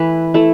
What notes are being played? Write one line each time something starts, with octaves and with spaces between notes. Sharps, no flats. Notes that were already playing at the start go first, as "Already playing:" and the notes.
Already playing: E3 A3 E4 B4
A3 E4